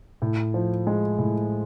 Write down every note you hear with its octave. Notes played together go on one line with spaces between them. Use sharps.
A2
F3
G#3
A2